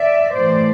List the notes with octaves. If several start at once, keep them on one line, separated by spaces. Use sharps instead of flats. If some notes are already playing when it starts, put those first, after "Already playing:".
Already playing: D5 E5
A2 E3 A3 C5 D5